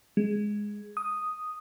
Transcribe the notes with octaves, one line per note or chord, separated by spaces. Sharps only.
G#3
D#6